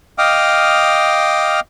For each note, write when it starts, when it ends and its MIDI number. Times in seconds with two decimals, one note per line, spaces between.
0.18 1.60 75
0.18 1.60 77
0.18 1.60 79
0.18 1.60 86
0.18 1.60 87
0.18 1.60 89